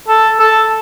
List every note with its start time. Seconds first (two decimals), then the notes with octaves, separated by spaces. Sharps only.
0.08 A4
0.40 A4